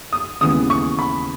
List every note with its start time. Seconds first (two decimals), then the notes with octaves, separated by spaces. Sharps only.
0.12 D#6
0.41 D#2 C#3 E3 G#3 B3 D#6
0.70 C#6
0.99 B5